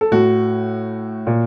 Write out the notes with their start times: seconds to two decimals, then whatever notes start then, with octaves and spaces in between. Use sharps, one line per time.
0.01 A4
0.12 A2 F#4
1.27 A#2